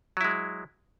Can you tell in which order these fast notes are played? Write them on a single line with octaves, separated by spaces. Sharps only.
F#3 E4 G#3